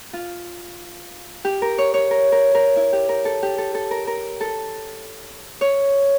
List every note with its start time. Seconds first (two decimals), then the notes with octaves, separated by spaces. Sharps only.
0.13 F4
1.45 G4
1.62 A#4
1.78 C#5
1.94 C#5
2.11 A#4
2.32 A#4
2.55 A#4
2.76 E4
2.93 G4
3.09 A#4
3.25 A4
3.43 G4
3.58 A4
3.74 A4
3.91 A#4
4.07 A#4
4.41 A4
5.61 C#5